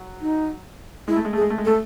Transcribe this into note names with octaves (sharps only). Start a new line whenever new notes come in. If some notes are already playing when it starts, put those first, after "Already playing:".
Already playing: F#3
D#4
G#3 E4
A3
G#3
A3 G#4
G#3
A3
G#3
A3 A4